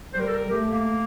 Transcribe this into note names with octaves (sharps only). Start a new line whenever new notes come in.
G3 C5
A#4
A4
A#4
A3 G4
A#3